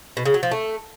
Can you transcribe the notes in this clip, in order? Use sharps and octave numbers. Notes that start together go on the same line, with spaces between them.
B2
C#3
F#3
F3
A3